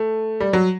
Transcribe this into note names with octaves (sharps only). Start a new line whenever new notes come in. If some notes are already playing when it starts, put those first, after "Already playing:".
Already playing: A3
G3
F#3